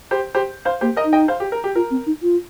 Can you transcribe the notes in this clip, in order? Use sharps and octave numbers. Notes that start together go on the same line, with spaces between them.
G4 C5
G4 C5
C5 F5
A#3 G4 C5
A#4 D#5
D#4
D#5 G5
C5 F5
G4
A#4
G4
F4 A#4
C4
D#4
F4